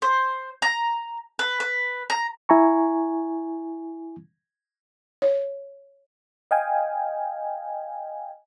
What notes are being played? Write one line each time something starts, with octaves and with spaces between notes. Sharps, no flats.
C5
A#5
B4
B4
A#5
E4 G#5 A#5 C#6
C#5
D#5 F5 G5 G#5